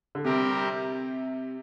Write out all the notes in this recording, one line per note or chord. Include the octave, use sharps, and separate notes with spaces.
D3
C3 G3 C4 G4 A#4